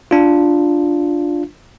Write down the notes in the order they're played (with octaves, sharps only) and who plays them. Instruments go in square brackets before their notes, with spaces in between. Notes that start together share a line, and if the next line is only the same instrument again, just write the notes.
[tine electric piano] D4 F4